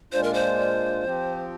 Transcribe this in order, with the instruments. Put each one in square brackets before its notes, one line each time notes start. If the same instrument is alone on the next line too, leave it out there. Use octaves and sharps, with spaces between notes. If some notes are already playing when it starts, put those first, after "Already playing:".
[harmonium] A#2 G#3 D4 F4 [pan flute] C5
[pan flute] A#4
C5
[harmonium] F3 C4 G4